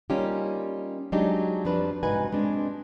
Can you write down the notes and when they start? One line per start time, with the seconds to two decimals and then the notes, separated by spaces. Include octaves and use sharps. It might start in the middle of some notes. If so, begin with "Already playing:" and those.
0.10 G3 A#3 C#4 D#4 F4 G4
1.12 F#3 G#3 D4 D#4 G4
1.65 F2 F3 G3 D4 B4
2.03 G#2 C3 D#4 F#4 B4 G#5
2.32 G#3 C4 D4